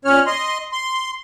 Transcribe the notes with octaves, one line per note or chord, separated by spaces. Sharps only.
A#2 C#4 C#5 F6
D#5 C6
C6